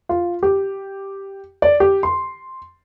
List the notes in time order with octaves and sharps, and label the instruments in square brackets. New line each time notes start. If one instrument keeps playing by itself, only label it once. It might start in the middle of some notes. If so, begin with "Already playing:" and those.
[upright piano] F4
G4
D5
G4
C6